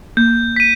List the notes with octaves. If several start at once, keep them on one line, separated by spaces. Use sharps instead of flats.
A#3 G6
B6 D#7